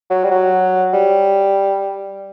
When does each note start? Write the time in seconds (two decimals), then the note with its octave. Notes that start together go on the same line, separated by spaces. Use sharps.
0.10 F#3
0.24 G3
0.31 F#3
0.93 G3